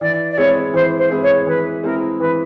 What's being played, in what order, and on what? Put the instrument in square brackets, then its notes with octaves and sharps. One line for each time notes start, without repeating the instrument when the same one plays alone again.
[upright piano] E3 [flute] D5
[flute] D5
[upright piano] G#3 C4 E4 G#4 [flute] C#5
[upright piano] E3 [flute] C5
[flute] C5
[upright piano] G#3 C4 E4 G#4
[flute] C#5
[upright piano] E3 [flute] B4
[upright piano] G#3 C4 E4 G#4 [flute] A#4
[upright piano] E3 [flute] B4